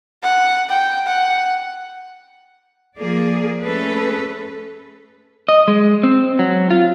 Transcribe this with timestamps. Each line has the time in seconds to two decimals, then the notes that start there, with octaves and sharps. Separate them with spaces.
0.22 F#5
0.69 G5
1.06 F#5
2.98 F3 A#3 G#4 D5
3.62 A3 C#4 G#4 A4 B4
5.49 D#5
5.68 G#3
6.03 C4
6.39 F#3
6.70 F4